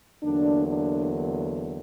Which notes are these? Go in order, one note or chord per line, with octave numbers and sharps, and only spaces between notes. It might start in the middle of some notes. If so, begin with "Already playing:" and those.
E2 D3 F#3 A#3 D4
D4